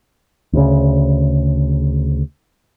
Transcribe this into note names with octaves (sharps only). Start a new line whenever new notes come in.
D2 C#3